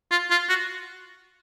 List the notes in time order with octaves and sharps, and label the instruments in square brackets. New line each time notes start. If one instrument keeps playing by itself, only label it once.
[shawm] F4
F4
F#4